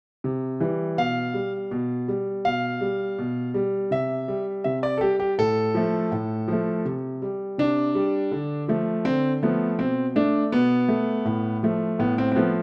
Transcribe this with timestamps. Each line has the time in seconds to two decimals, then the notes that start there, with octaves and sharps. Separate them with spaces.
0.24 C3
0.60 E3 G3
0.97 B2 F5
1.34 G3
1.71 B2
2.08 G3
2.45 B2 F5
2.81 G3
3.19 B2
3.54 G3
3.91 C3 E5
4.28 G3
4.64 C3 E5
4.83 D5
4.98 A4
5.01 G3 G4
5.20 G4
5.38 A2 A4
5.74 F3 A3
6.12 A2
6.48 F3 A3
6.85 C3
7.22 G3
7.58 C3 D4
7.95 G3
8.31 D3
8.68 F3 A3
9.05 D3 C4
9.43 F3 A3 B3
9.78 B2 C4
10.16 A3 D4
10.52 B2 B3
10.88 A3
11.25 A2
11.63 F3 A3
11.99 A2 B3
12.18 C4
12.32 C4
12.35 F3 A3 B3